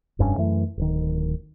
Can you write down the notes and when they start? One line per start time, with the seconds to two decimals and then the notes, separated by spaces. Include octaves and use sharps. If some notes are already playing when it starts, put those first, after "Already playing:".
0.19 F1 G2 C3 C#4
0.38 F#2 E3 A3
0.77 D1 D#3